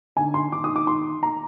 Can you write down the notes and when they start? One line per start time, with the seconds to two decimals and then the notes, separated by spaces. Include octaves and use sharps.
0.17 D3 G#5
0.34 C6
0.52 D#3 D6
0.64 D#6
0.76 D6
0.87 C6
1.23 A#5